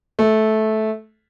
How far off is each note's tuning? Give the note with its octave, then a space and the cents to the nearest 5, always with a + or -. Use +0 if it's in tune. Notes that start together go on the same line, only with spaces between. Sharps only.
A3 -15